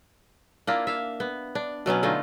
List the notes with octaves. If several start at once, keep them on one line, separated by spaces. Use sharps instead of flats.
A#3 D4 E4 F4
E5 F5
B3
D4
B2 F#3 B3 C#4
D3 A3 D#4 F4